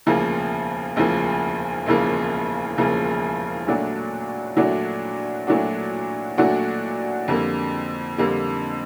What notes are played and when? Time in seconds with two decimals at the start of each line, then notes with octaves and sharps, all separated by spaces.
0.06 E1 D2 C#3 F3 A#3
0.96 E1 D2 C#3 F3 A#3
1.86 E1 D2 C#3 F3 A#3
2.77 E1 D2 C#3 F3 A#3
3.67 A#2 F#3 A3 D4 F#4
4.57 A#2 F#3 A3 D4 F#4
5.47 A#2 F#3 A3 D4 F#4
6.38 A#2 F#3 A3 D4 F#4
7.28 F2 D3 G3 A#3
8.18 F2 D3 G3 A#3